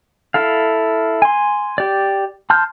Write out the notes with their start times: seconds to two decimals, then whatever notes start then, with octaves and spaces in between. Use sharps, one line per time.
0.34 E4 A4 F5
1.22 G#5 C6
1.78 G4 D5
2.50 A5 C6 F6 G6